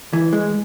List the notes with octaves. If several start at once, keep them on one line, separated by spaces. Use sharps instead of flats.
E3
G#3